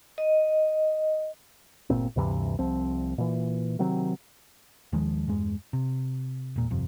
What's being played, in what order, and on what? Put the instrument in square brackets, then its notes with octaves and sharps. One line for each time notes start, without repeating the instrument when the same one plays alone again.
[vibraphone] D#5
[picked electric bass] G1 C2 A#2 C4
D2 G2 C3 E3
C2 F3 C4
A#2 E3
C3 D#3 F#3 C4
D#2 D#3 F3 G#3
E2 G2 G#3
C3
E1 A#2
G1 F2 C3